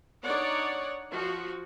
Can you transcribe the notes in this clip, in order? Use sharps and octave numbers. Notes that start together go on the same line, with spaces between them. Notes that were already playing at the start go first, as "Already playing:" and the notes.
D4 D#4 C#5 D5 F#5
F3 F#4